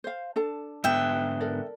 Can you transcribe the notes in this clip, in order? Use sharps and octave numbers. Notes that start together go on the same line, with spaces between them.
C5 F5
D4 A4 A5
G#2 D3 B3 E5 G5
A4 A#4 D5